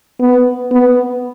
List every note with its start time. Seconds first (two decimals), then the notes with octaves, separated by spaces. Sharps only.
0.20 B3
0.71 B3